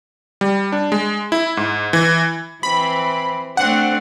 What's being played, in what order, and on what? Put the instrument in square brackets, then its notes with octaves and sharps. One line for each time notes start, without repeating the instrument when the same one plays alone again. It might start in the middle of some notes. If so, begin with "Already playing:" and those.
[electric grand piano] G3
D4
G#3
E4
G#2
E3
[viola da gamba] E3 C4 [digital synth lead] B5
[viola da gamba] A3 C4 D4 [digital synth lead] F#5